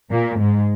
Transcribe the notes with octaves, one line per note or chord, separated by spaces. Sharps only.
A#2 A#3
G#2 G#3